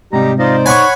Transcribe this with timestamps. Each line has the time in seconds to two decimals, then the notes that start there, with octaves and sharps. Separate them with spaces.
0.13 G#2 C3 G3 D#4 G4 A#5
0.39 D#4 F4 C5 D5 D#5
0.66 C#5 F#5 G#5 B5 C#6